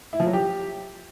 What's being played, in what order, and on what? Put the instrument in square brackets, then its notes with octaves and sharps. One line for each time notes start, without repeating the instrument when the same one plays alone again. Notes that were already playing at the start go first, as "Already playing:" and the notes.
[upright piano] E4
F3
F#3
G4